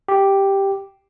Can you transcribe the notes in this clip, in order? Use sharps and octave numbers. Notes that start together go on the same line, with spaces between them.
G4